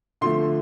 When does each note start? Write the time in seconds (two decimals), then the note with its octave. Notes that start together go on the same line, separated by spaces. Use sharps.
0.21 D3 F3 A3 C6